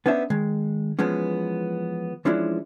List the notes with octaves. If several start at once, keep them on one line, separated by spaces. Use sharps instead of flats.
B3 C#4 D4 C5 E5
D#3 G#3
E3 F3 G#3 B3 C#4
E3 F3 G#3 C#4 D4 E4